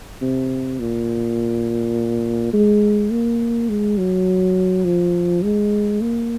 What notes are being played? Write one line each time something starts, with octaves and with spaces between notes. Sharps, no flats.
C3
A#2
G#3
A#3
G#3
F#3
F3
G#3
A#3